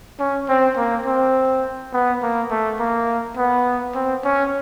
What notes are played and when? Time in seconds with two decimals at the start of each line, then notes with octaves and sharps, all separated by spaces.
0.20 C#4
0.49 C4
0.77 A#3
1.06 C4
1.93 B3
2.22 A#3
2.51 A3
2.80 A#3
3.37 B3
3.95 C4
4.25 C#4